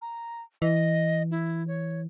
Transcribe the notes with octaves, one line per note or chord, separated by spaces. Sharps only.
A#5
E3 D#5
E4
C#5